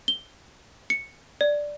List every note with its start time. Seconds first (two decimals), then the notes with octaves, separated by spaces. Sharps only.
0.08 G7
0.90 C#7
1.41 D5